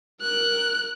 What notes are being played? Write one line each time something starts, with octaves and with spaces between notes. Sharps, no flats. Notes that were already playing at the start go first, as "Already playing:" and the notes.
A#4 F#6